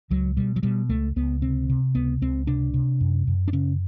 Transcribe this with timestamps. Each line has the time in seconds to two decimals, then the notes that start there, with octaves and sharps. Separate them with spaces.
0.10 C#2 F#3
0.37 B2 G3
0.56 F#3
0.63 B2 G3
0.89 C#2 A3
1.16 C#2 B3
1.42 C3 C4
1.69 C3
1.95 C#2 B3
2.21 C#2 C4
2.47 C3 D4
2.74 C3
3.01 F#2
3.27 F#2
3.48 D4
3.53 C#3 C#4